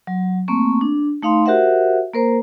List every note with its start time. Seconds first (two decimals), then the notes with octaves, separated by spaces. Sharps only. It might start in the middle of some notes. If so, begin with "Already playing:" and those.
0.07 F#3
0.48 A3 A#3 C4 C#6
0.81 D4
1.22 A3 D#4 F5 C6
1.46 F#4 G4 A#4 C5 E5 F#5
2.14 A#3 A#4 C5 A#5